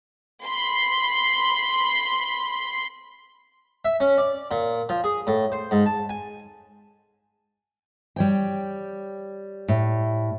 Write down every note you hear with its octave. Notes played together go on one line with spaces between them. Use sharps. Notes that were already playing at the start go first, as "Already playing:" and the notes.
B5 C6
E5
C#4
D5
A#2
F3
G#4
A2
C5
G#2
A5
G#5
G3 C#5 G5
A2